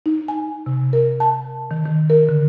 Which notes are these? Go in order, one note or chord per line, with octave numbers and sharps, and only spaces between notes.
D#4
G#5
C3
A#4
A5
D#3
D#3
A#4
D3